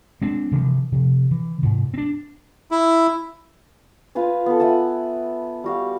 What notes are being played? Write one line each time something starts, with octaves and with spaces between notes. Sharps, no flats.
G#3 C4 D4
C3 E3 F3
C3 F3
E3
G#2 C3
C4 D4
E4
F4 B4 F5 G#5
B3 A4
E5 F#5 G#5 A5
G3 F#4 F5